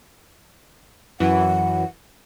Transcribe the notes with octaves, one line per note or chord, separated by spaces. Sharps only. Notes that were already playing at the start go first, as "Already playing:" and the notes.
F#2 E3 F#4 F#5